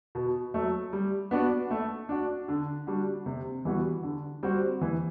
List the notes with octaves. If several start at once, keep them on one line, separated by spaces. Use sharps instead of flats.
B2
F#3 A3
G3
B3 D4 F#4
A3
D4 F#4
D3
G3 D4 F#4
C3
E3 G3 B3 F#4
D3
G3 C4 F#4
E3